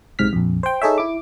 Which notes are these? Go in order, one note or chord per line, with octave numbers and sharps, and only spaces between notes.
B1 G#2 C3 F6 B6
A#1 F2
C5 G5
D#4 G#4 A4 C#5 E5
E4 D6